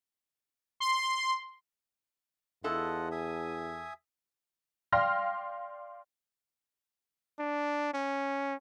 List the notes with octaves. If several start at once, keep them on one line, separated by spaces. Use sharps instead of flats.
C6
E2 E4 F4 A4 D#5 F#5
E5 G#5 D#6
D5 F5 G5 C6 F6 A#6
D4
C#4